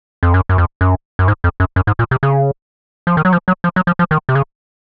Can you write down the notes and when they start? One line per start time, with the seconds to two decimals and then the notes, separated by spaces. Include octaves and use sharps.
0.23 F2
0.34 F#2
0.49 F#2
0.58 F2
0.81 F#2
1.19 F#2
1.28 G#2
1.44 F2
1.60 F#2
1.76 F#2
1.87 G#2
1.99 A#2
2.11 C3
2.23 C#3
3.07 F3
3.17 D#3
3.25 F#3
3.33 F3
3.48 F#3
3.64 F3
3.76 F#3
3.87 F3
3.99 F3
4.11 D#3
4.29 C3
4.35 C#3